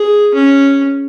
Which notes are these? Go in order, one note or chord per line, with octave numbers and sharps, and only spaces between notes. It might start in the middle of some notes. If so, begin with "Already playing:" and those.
Already playing: G#4
C#4